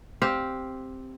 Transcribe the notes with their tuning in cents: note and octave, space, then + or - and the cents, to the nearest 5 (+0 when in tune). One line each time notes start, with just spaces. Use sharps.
C4 +0 G4 +0 F5 +0